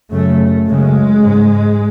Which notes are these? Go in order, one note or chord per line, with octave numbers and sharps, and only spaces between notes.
F#2 C#3 A3
F#2 C#3 G#3
G#2